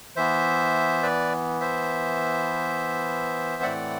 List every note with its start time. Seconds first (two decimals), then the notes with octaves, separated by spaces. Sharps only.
0.16 E3 B3 C5 E5
1.03 B4 D5
1.60 C5 E5
3.63 A2 E3 A3 C4 D5 F#5